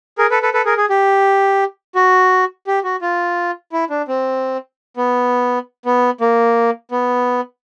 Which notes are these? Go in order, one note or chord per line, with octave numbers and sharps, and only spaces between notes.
G#4 A#4
A4 B4
A4 B4
A4 B4
G#4 A#4
G#4
G4
F#4
G4
F#4
F4
E4
D4
C4
B3
B3
A#3
B3